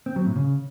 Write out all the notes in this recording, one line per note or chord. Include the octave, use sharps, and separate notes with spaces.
C4
F#3
A2
C#3